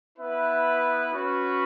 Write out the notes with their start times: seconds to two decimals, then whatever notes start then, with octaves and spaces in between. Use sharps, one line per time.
0.16 B3 E4 B4 E5
1.13 C#4 F#4 B4